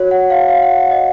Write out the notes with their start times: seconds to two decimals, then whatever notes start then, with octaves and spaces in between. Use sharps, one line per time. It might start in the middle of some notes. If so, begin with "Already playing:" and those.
Already playing: F#4 C#5
0.11 F#5
0.30 F5
0.49 F5
0.63 F#5
0.77 F#5
0.91 D#5